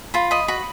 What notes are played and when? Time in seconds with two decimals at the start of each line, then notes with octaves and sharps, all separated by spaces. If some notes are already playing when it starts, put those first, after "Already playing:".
0.14 F4 B5
0.31 D#5 B5
0.48 F#4 B5